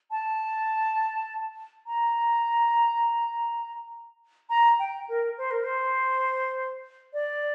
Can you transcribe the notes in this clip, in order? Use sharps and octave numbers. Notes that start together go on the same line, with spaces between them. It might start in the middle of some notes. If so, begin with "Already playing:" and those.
A5
A#5
A#5
G5
A#4
C5
A#4
C5
D5